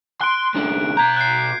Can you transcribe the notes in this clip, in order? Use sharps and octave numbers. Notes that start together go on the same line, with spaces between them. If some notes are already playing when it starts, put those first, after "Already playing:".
C6 F#6 D7
C2 D3
B2 A#5 G6 G#6
F#6 C7